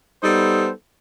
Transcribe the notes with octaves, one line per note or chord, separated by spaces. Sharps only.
G3 B3 D#4 A4 C5